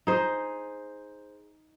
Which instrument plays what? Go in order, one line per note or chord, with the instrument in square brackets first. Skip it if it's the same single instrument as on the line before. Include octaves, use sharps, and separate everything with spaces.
[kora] D#4 G#4 C5